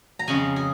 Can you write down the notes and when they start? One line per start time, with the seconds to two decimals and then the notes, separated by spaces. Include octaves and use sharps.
0.19 A#5
0.28 F2 C#3 G#3 G#5
0.56 G#4